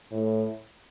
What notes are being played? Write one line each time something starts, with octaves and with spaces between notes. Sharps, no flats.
A2